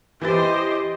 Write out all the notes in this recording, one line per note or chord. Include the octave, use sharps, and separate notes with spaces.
E3 E4 G4 C5 D#5 A6